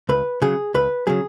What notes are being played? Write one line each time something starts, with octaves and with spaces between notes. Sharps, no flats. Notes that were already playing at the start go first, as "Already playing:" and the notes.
C#2 B4
C#3 F#3 G#4
C#2 B4
C#3 F#3 G#4